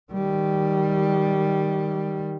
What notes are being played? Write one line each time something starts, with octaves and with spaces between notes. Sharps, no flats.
D#3 G3